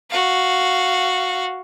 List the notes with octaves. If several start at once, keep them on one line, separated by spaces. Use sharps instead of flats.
F#4 F5